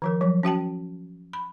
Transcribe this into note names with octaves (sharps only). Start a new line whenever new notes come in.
D#3 F3 A#4
F3 F#3
C#4 F#4 G5 A5
B5